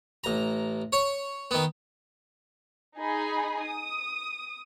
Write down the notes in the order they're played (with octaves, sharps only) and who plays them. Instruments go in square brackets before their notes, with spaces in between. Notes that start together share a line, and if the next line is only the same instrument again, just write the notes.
[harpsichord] A1 A#5
C#5
D#3 B3
[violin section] D#4 G#4 G#5 B5
D#6